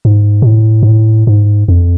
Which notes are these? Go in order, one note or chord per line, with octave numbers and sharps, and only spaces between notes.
G#2
B2
A2
G#2
A2
G#2
F2